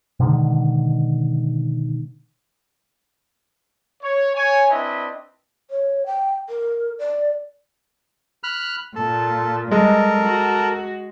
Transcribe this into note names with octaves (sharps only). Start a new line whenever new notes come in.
B2 D3 D#3 G#3
C#5
C#5 G#5
C4 D4 E4 B4 D#5 E5
C#5
G5
A#4
D5
B5 F6 F#6
A#2 A4
G3 G#3 A4 A#4
F#4